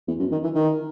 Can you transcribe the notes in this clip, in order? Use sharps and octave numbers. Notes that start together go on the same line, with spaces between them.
E2
F#2
D#3
E3
D#3